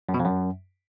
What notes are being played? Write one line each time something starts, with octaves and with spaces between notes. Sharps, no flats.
F#2
B2
F2
F#2